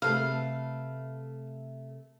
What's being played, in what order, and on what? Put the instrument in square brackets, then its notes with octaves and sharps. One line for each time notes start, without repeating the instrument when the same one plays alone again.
[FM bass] C3 [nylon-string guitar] A3 A4 B4 [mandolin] F5